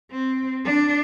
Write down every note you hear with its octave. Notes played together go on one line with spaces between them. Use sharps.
C4
D4